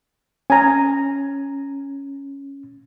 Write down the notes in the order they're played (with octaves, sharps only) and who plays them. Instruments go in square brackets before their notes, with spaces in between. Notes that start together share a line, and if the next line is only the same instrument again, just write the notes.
[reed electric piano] C#4 [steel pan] G#5 A#5